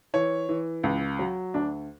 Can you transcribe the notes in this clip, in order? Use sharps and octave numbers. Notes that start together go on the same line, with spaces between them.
E3 C#5
E3
C#2
F#3
D2 D4